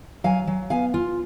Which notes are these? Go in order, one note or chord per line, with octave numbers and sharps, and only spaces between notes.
F#3 F5 G#5
F#3
B3 F5 G#5
F4